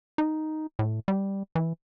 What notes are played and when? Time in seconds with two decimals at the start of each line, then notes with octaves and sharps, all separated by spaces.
0.18 D#4
0.79 A2
1.08 G3
1.55 E3